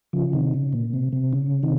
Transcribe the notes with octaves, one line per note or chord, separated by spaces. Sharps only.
C#3 F3
C3 D#3
C#3
A#2
C3
C3
C#3
C3 D#3